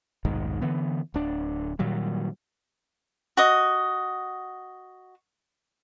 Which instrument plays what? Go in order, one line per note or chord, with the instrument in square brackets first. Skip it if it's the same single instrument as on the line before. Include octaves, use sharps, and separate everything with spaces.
[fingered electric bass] F1 B1 G#2 D#3
D3 E3 B3
D1 D4
A#2 D#3 F#3 G3
[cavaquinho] F#4 D#5